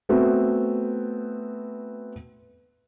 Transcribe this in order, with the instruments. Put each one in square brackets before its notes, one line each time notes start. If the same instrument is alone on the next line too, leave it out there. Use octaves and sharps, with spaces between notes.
[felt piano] A3 B3 C4 F#4